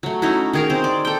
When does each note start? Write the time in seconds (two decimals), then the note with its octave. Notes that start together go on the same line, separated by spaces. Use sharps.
0.03 F#3 A3
0.22 C#4 D#4 E4 F#4
0.53 D#3 G#4 A#4
0.70 C4 C5
0.84 D5
1.05 A4 G5